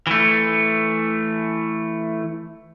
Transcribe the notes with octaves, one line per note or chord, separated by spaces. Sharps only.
E3 A3